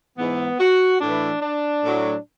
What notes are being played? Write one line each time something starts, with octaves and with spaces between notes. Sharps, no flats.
G#2 E3 B3
F#4
A2 E3 D4
D4
A2 F#3